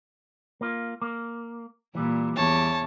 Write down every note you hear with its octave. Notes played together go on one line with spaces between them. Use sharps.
A#3 F4
A#3
A#2 E3 G3
E2 C#5 A5